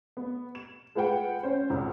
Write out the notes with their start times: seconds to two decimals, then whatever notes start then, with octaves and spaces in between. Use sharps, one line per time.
0.17 B3
0.55 E7
0.95 G#3 F4 B4 F#5 G5
1.43 C#4 C5
1.70 G#1 C#2